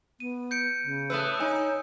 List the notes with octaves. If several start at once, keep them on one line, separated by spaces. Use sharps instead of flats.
B3 D#7
G6 C#7 D7
C#3
A2 A3 B4 D#6 E6
D#4 C#5 G#5